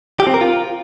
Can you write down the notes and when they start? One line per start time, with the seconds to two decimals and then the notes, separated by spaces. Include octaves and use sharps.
0.20 G4
0.27 C4
0.34 A#4
0.41 F4